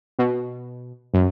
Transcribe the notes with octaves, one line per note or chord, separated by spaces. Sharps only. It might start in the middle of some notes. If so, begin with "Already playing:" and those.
B2
F#2